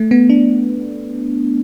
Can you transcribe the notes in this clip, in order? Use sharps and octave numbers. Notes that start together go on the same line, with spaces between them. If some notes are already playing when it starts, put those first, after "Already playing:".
Already playing: A3
B3
D4